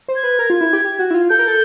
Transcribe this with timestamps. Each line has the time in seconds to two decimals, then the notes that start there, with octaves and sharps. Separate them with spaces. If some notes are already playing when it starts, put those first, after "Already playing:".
0.08 C5
0.16 G#6
0.23 B4
0.39 A#4
0.50 F4
0.61 E4
0.73 G4
0.85 G4
0.99 F#4
1.11 E4
1.14 F4
1.30 A4 G6
1.39 A#4
1.47 A4